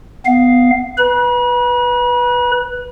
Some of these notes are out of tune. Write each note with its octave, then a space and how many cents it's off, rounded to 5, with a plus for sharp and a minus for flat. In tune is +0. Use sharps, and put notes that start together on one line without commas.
B3 +15 F5 +0
B4 +0 B5 -40